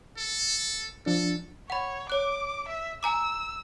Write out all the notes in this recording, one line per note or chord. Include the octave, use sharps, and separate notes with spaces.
A4
F3 D4 A4
C#5 F#5 B5
C#5 D6 F#6
E5
G#5 A#5 D6 E6